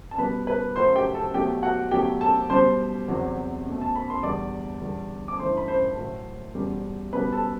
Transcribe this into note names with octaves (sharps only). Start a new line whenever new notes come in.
A5
B2 G3 B4 B5
B4 B5
F#2 F#3 A3 C5 C6
G4 G5
A4 A5
B2 F#3 A3 G4 G5
F#4 F#5
B2 F#3 A3 G4 G5
A4 A5
B2 G3 C5 C6
E2 C3 F#3
B2 A3
A5
B5
C6
E2 D3 G3 D5 D6
E2 D3 G3
D6
G2 E3 A3 C5 C6
B5
C5 C6
A2 F#3 A3
E2 B2 G3
B2 G3 B4 B5
A4 A5